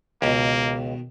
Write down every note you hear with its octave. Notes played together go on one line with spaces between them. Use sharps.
C#2 B2 D#3 A#3